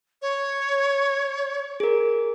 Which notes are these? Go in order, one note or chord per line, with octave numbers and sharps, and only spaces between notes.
C#5
G#4 A#4